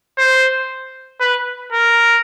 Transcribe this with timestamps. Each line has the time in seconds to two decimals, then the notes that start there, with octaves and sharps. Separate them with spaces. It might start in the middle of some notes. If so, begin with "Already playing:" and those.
0.18 C5
1.21 B4
1.73 A#4